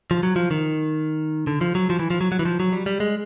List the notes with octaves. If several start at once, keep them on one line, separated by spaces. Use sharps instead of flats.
F3
F#3
F3
D#3
D3
F3
F#3
F3
E3
F3
F#3
F#3
E3
F3
F#3
G3
G3
G#3